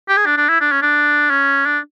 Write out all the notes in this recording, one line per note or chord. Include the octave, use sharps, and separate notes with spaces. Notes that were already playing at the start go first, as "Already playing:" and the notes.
G4
G#4
D4
D4
E4
D4
C#4
D4
C#4
D4